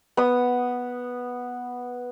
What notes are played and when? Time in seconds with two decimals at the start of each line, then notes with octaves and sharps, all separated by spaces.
0.17 B3 D#6